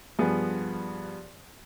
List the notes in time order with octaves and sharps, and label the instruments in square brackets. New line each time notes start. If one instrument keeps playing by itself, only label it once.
[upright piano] G2 F3 B3 G#4